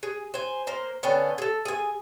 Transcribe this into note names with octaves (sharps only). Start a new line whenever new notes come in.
G#4
C5 G#5
A#3 A#4 C5
D3 B3 C#4 G5
G#4 A4
G#4 G#5